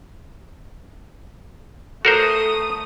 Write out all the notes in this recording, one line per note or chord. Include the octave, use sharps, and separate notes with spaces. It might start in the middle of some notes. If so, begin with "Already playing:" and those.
A3 F#4 A4 A#4 C5 A#5 D#6